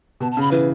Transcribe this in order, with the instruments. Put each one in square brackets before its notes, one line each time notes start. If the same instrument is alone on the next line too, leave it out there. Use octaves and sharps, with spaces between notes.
[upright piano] B2 [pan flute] A5
[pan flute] A5
[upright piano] C#3
[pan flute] B5
[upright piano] E3 [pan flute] B4